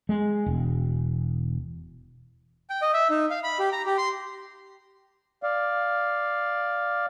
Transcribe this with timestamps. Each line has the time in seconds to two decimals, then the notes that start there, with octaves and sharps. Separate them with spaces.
0.09 G#3
0.46 E1
2.70 G5
2.82 D#5
2.94 E5
3.10 D#4
3.30 F5
3.44 B5
3.60 G4
3.72 A#5
3.86 G4
3.98 C6
5.43 D5 F5